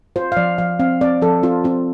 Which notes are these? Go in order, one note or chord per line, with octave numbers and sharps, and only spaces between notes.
F4 C5
F5
F3 D5
F3 F5
C4 F5
C4 D5
F3 A4
C4 F4
C4 F4